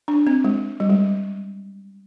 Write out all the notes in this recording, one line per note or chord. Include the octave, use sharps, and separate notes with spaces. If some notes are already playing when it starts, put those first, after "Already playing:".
D4
C4
G#3
G3
G#3